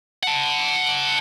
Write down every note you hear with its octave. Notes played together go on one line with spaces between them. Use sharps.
F#5 A5